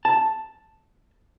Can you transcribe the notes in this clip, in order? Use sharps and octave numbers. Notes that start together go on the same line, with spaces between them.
A5